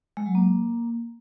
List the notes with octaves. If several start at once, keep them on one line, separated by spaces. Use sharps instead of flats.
G#3
F#3
A#3